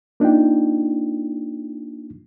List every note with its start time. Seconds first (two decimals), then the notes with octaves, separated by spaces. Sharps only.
0.20 A#3 D4 D#4 F4 G5